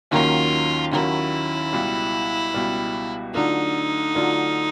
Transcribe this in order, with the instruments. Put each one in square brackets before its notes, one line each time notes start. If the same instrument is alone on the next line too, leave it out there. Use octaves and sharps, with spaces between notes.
[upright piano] D#2 D#3 F#3 A#3 C#4 [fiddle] F4
[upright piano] D#2 D#3 F#3 A#3 C#4 [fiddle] E4
[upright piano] C#2 B2 G3
C#2 B2 G3
[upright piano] D3 F#3 A3 D4 F4 [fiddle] D#4
[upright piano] D3 F#3 A3 D4 F4